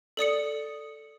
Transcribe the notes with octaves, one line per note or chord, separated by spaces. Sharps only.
A4 D5 D#6 C#7